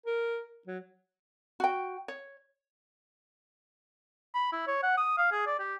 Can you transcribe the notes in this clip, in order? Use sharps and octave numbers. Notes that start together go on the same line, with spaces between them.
A#4
F#3
F#4 G5
C#5
B5
E4
C#5
F#5
D#6
F5
G#4
D5
G4